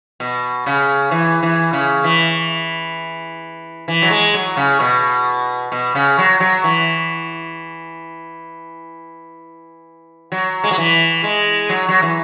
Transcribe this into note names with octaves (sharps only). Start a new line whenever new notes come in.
B2
C#3
E3
E3
C#3
E3
E3
F#3
G#3
F#3
C#3
B2
B2
C#3
F#3
F#3
E3
F#3
G#3
F#3
E3
G#3
F#3
F#3
E3